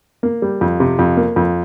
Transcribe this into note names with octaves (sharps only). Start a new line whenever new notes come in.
A#3
G3
F2
C3
F2
A#3
F2